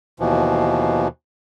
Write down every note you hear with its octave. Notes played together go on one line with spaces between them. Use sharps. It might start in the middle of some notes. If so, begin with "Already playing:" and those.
D#2 B2 E3 F3